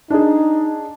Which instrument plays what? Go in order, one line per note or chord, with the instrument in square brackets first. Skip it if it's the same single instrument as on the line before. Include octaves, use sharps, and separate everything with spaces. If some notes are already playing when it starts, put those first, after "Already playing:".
[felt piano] D4 G#4 [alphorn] D#4